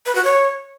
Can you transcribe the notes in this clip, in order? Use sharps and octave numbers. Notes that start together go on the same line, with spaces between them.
B4
F#4
C#5